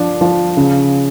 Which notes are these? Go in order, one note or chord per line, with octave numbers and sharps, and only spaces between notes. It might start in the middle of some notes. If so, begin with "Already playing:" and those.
Already playing: F3 D4
F3
C#3